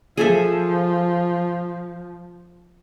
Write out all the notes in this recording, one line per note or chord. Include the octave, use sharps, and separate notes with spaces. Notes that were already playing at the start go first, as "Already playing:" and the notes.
F3 G#4 A4 E5